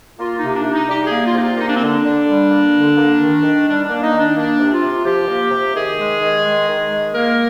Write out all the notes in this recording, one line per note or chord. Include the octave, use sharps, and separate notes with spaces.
A#3 F4
D#4
C3
D4
C3
D#4
G3 G4
G4
G#4
A#3
F4
C3 D#4
F4
A#3 D#4
D4
C4
D3 D4
D3
G3
A#3
D3
A#3
D#3
D#3
G3 D4
D4
A#3
D#4
D#3
D4
A#3 D4
C3
F4
C3
F3 G4
A#3
C3
D#3 G#4
G#3
D#3
G#3
D#3
G#3
A#3 A#4